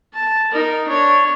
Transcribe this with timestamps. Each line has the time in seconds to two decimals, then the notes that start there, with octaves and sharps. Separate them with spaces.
0.14 A5
0.53 D#4 A#4
0.88 D4 C#5